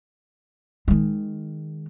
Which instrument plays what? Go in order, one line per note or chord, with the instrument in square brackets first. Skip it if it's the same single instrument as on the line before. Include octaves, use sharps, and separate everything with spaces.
[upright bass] D#3 G#3